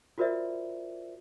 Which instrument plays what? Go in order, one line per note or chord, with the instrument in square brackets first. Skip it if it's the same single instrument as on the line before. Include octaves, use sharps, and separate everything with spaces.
[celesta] F4 F#4 A#4 C5 D5 E5